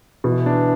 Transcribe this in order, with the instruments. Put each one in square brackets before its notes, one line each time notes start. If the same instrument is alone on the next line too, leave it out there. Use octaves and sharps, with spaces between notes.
[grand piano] B2 [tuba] E3
[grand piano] D4